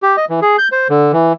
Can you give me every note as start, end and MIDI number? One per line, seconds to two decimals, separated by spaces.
0.02 0.16 67
0.17 0.25 75
0.30 0.40 52
0.42 0.56 68
0.58 0.68 91
0.72 0.88 72
0.90 1.12 50
1.13 1.33 52